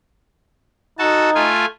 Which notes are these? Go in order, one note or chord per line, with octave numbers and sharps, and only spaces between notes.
D#4 F#4 A4 A5
A3 F4 G#5